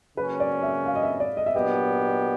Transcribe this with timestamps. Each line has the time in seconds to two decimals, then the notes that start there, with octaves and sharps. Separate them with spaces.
0.17 C#3 F#3 A#3 C#4 B4
0.40 D5
0.63 E5
0.86 F5
0.95 D#5
1.03 E5
1.20 D5
1.37 D#5
1.46 E5
1.54 A#2 F#3 B3 D4 G4 D#5